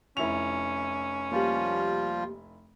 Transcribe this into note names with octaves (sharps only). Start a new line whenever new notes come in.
F1 C#4 E4 F7
F3 G3 A#3 F4 G4